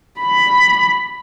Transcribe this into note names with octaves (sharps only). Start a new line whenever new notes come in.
B5